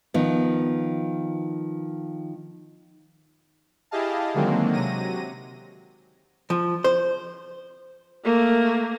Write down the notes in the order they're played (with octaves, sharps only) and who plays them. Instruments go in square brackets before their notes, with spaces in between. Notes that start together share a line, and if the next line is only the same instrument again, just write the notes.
[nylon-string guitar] D#3 F3 B3
[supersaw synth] E4 G4 G#4 D#5 F5 A5
D3 D#3 F#3 G#3 A#3 C4
C3 F#3 A#6 D#7
[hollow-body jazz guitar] F3
C5
[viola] A3 A#3